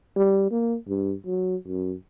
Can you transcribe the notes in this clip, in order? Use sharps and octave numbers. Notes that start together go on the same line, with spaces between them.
G3
A#3
G2
F#3
F#2